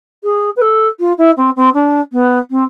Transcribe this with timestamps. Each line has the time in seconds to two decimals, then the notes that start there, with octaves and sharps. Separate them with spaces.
0.24 G#4
0.56 B4
0.61 A4
1.00 F4
1.18 E4
1.37 C4
1.56 C4
1.74 D4
2.12 B3
2.51 C4